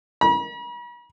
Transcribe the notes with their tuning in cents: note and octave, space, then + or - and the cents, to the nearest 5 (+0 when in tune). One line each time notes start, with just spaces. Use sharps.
B5 -45